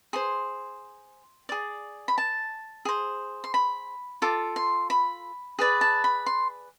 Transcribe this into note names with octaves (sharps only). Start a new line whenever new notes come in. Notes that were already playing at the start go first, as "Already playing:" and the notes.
G#4 C5 C6
G#4 D5
B5
A5
G#4 C5
C6
B5
F4 A4 D6
C6
B5
G#4 B4 D5
A5
B5
C6